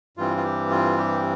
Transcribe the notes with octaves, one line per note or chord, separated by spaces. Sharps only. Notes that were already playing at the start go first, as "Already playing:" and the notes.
G2 E3 G3 C4 F4
F4
G4
F4
G4